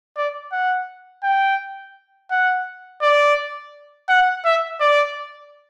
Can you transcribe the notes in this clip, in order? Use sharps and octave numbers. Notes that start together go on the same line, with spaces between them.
D5
F#5
G5
F#5
D5
F#5
E5
D5